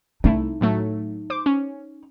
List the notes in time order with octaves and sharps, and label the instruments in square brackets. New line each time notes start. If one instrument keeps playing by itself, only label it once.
[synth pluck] C2 A3 E4 [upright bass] D#4
[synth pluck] A2 F#3 A3
C5 D6
C#4